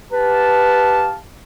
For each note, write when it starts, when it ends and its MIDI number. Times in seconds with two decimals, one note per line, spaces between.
0.12 1.15 67
0.12 1.08 71
0.12 1.15 77
0.12 1.15 81